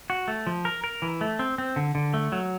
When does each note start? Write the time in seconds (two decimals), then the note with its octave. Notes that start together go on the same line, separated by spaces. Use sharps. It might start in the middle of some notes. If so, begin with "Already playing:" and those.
0.10 F#4
0.28 A3
0.47 F3
0.65 A#4
0.84 A#4
1.02 E3
1.21 A3
1.39 C4
1.58 C4
1.76 D3
1.95 D3
2.14 A3
2.32 F#3